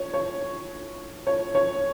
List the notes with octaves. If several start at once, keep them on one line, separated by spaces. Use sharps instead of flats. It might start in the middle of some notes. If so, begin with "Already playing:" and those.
Already playing: C#5
C#5
C#5
C#5